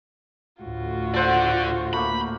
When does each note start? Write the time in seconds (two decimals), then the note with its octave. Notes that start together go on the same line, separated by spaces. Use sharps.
0.63 D2 A2 F4 F#4
1.14 D3 A4 C5 D5 F#5
1.93 A3 A#3 B5